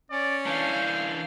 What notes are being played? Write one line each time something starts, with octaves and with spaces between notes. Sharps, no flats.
C#4 D5
E3 D4 F5 G6